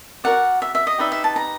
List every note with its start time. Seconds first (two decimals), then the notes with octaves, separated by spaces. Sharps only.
0.24 F#4 A#4 D5 F#5
0.62 E5
0.75 E5
0.87 D#5
0.98 D#4 G4 B4 D5 E5
1.12 E5
1.24 A5
1.36 A#5